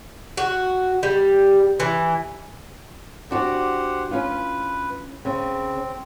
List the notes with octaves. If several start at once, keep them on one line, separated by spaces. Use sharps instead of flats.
F#4
G3
E3
D4 F#4 G4 C5 D5 F#5
C#4 F4 B4
C#3 C4